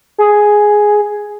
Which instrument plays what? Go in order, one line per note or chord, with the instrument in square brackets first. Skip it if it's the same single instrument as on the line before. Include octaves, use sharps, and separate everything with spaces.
[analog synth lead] G#4